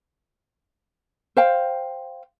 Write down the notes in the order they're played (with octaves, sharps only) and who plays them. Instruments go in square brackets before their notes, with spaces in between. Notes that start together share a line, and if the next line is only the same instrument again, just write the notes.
[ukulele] C5 F5 G5